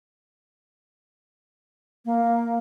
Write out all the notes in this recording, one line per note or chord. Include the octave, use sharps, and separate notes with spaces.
A#3